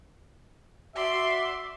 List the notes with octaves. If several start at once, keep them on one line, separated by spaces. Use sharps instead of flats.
F#4 D5 E5 C6